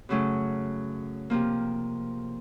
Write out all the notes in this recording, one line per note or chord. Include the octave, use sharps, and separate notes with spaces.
F#2 C#3 F#3 A3 C#4
C3 F3 A#3